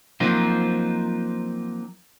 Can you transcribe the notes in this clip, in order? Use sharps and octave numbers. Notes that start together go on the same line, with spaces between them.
F3 F#3 A#3 C4 D#4 F4